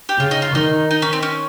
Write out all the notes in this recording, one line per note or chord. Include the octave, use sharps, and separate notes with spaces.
G4
C#3 F4
D#4
F4
D#3 D#4
D#4
C#4
C4
C#4